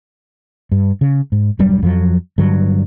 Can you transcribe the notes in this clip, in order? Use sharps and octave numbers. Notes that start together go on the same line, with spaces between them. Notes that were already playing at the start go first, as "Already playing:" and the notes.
G2
C#3
G#2
E1 G2 F#3 G3
F2 F3 F#3
G2 D3 F#3